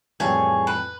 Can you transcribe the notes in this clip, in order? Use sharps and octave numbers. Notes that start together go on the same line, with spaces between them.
F2 A2 E3 F3 G3 G#4 C#5
B4